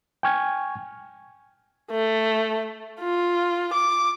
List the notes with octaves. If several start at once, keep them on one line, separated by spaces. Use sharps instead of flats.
G5 G#5 C#6 F6 G#6
A3
F4
D6